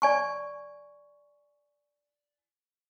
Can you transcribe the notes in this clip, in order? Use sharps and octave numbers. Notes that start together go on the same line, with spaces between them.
D5 G#5 C#6